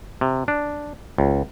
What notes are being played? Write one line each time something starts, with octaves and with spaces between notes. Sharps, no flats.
C3
D4
C#2